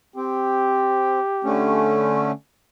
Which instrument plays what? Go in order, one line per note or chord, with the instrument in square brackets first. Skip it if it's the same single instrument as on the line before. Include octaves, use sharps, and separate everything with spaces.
[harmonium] C4 [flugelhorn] G4
[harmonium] D3 A3 C#4